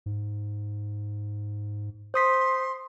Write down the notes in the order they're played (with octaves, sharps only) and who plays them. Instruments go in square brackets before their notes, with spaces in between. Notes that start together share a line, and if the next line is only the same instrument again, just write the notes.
[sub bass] G#2
[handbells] C5 D#6 B6 [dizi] C6